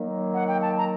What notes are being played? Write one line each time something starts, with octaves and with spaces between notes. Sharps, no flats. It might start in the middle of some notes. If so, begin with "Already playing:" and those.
Already playing: D#3 F#3 A#3
F#5
G5
A5
A#5